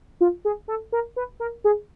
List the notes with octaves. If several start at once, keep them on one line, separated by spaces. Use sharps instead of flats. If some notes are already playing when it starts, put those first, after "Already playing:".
F4
G#4
A4
A#4
B4
A#4
G#4